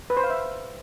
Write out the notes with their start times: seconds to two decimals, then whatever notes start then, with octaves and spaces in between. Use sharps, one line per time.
0.10 B4
0.17 C5
0.24 F5
0.30 E5